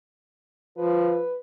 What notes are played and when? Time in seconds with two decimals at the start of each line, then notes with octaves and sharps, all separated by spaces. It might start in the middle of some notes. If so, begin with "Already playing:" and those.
0.77 F3 B4